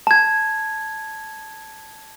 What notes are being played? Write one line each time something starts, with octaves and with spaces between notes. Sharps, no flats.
A5 G#6